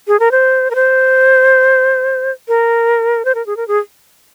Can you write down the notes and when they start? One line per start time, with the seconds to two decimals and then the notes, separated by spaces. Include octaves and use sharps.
0.08 G#4
0.20 A#4
0.31 C5
0.71 A#4
0.75 C5
2.48 A#4
3.25 C5
3.35 A#4
3.46 G#4
3.57 A#4
3.68 G#4